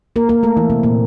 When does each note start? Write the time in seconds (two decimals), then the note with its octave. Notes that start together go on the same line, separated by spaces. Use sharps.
0.16 A#3 A#4
0.29 A#3 A#4
0.43 A3 A4
0.57 E3 E4
0.70 C3 C4
0.83 A#2 A#3